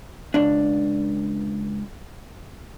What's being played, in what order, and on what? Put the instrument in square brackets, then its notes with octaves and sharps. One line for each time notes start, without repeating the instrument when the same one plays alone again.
[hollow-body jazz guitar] C#2 D4